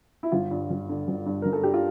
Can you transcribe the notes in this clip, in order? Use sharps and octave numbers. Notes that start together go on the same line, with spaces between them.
E4
G1 F4
G2
G1
D3
G1
G2
G1 A#4
A4
D3 G4
F4